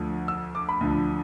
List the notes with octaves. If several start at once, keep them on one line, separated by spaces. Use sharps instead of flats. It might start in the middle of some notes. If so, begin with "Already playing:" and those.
Already playing: D2 D3 F3
E6
D6
B5
D2 D3 F3